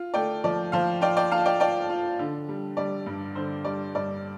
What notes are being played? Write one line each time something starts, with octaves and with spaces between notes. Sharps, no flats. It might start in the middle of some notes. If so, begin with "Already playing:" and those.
Already playing: F4
A3 D5 G5
F3 D5
F3 C5 F5
F4 D5 G5
D5 G5
F4 F5 A5
D5 G5
F4 D5 G5
F4
D3
G3
G3 D5
G2
D3 C5
G3 D5
G2 D5